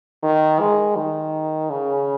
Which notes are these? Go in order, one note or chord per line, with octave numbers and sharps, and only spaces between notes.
D#3
G#3
D#3
C#3